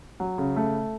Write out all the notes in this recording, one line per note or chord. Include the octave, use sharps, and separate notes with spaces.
F#3
C#3
A3